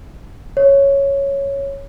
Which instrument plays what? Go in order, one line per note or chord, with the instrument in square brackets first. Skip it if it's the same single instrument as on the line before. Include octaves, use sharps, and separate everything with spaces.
[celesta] C#5